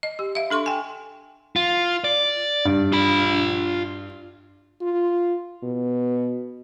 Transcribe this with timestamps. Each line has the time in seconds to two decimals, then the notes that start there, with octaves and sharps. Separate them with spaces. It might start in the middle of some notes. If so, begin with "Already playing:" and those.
0.03 D#5
0.19 G4
0.35 E5 F5
0.50 D4 A4 C6 C#6
0.66 G5 G#5
1.56 F4
2.04 D5
2.65 G2
2.92 F4 B5
4.82 F4
5.63 B2